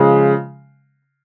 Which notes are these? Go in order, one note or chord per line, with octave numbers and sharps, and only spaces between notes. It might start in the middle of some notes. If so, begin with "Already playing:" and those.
Already playing: C#3 F3 G#3